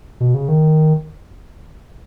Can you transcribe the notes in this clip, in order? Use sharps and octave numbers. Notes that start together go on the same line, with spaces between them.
B2
C#3
D#3